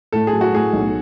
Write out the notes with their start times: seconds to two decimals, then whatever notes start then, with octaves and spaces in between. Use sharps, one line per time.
0.12 A2 A4
0.27 G#4
0.33 F#3
0.41 F#4
0.53 A2 G#4
0.73 B1